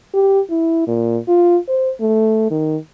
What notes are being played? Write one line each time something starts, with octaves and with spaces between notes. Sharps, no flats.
G4
E4
A#2
F4
C5
A3
D#3